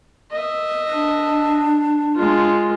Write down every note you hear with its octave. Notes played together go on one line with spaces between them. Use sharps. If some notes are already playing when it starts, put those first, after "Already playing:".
D#5 E5
D4
G#3 F4